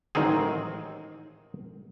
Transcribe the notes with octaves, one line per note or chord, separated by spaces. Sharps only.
A1 G#2 D#3 F#3 C4 G#4